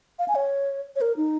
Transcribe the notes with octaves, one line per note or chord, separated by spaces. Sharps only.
F5
G#5
C#5
C#5
A#4
D#4